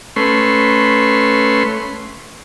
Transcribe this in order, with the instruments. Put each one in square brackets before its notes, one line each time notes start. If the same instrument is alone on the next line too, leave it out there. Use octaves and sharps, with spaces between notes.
[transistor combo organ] A3 C#4 B4 C6